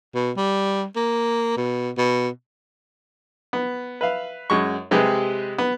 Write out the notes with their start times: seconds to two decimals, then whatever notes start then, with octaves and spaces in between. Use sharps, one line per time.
0.15 B2
0.37 G3
0.96 A#3
1.57 B2
1.98 B2
3.53 B3
4.01 B4 E5 F5
4.50 F#2 G#3 C#6
4.91 C3 G#3 G4 G#4 B4
5.58 B3